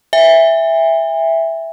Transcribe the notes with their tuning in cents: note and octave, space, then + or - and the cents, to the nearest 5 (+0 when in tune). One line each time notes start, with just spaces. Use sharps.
E5 +0 G#5 -45